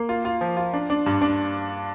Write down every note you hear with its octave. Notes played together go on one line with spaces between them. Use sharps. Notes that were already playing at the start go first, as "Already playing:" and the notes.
Already playing: A#3
F4
F4
F3
F4
D4
D4
G2
D4